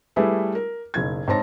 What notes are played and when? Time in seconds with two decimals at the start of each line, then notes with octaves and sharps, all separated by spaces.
0.16 G3 A3 E4 G4 G#4 B4
0.55 A#4
0.94 F#1 B1 G#6
1.28 G#2 C4 C#5 A5 A#6